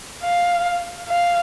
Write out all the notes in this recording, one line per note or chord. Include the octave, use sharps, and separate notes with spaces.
F5
F5